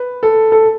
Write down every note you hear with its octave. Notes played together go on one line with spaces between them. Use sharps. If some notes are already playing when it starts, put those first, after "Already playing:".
Already playing: B4
A4
A4